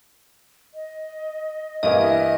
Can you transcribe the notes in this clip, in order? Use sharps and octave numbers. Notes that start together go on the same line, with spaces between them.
D#5
G2 E3 A#3 D#5 E5